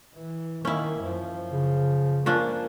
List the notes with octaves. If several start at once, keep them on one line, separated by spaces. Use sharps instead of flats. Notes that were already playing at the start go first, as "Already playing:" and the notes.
E3
D#3 A#3 C#4 E4
F#2 F3
C#3
F3 A#3 C#4 D4